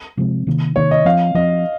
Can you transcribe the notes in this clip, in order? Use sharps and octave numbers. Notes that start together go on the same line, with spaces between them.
C3 F3 G#3 C4
C3 D#3 A#3
C3 D#3 A#3 C#5
D#5
F3 C4 F5
F3 C4 D#5